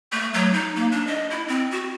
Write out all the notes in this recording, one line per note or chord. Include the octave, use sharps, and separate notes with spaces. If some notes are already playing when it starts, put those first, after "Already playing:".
A3
F#3
D#4
A#3
D4
D#5
E4
C4
F#4